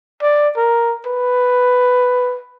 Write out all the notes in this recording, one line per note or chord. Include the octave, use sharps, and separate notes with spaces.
D5
A#4
B4